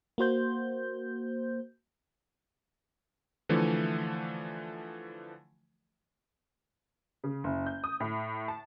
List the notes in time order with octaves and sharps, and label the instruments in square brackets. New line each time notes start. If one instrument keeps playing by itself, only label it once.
[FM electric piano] A#3 F#4 C5 G6
[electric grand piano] D3 E3 F3 A3
[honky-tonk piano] C#3
F#1
G6
D#6
A2
A5